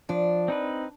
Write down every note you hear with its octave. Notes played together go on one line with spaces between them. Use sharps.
F3 D4
C4 D#4 B4